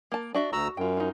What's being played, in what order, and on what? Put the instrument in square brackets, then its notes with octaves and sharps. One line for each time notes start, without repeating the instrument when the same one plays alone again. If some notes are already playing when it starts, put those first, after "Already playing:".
[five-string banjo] A#3 A5
D4 F#4 E5
[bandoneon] D2 A#5 E6 [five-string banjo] F#4
[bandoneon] F#2 [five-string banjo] F4 G5
[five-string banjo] D#4 F4